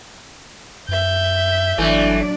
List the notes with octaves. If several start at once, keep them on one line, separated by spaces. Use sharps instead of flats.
F#2 E5 G6
G1 E3 F#3 A3 D4 D5